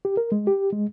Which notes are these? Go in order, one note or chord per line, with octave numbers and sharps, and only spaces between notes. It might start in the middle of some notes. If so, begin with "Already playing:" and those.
G4
A#4
G#3
G4
G#3